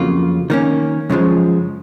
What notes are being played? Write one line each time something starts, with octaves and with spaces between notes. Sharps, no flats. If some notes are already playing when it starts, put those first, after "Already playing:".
Already playing: F2 C#3 F#3 A#3 F4
D#3 A#3 C#4
F#2 C#3 F3 G#3